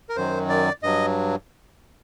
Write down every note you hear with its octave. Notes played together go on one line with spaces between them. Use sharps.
A#4
F#2 D#3 F#3 C5
D5
G2 F#3 D#5